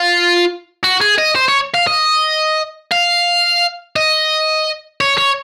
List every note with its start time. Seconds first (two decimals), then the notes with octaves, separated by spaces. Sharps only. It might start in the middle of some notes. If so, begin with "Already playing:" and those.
Already playing: F4
0.83 F#4
1.01 G#4
1.18 D#5
1.35 C5
1.49 C#5
1.75 F5
1.87 D#5
2.91 F5
3.96 D#5
5.01 C#5
5.18 C#5